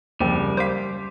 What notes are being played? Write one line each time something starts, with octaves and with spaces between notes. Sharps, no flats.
F#1 D#2 F3 G3 C4
C5 F5 C6 D6 B6